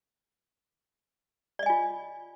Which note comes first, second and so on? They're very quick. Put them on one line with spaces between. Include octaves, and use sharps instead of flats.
D5 D#5 G#5 F4